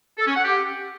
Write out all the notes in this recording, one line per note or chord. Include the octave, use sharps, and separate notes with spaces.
A4
C#4
F#5
G4